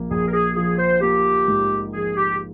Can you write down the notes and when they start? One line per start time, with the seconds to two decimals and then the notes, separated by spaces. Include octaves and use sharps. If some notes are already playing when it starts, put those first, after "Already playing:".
Already playing: A#1 A#3
0.11 A#1 G#4
0.28 A#4
0.33 G#4
0.56 F3 G#4
0.79 C5
1.02 A#3 G4
1.48 G#2
1.94 F3 G#4
2.17 G4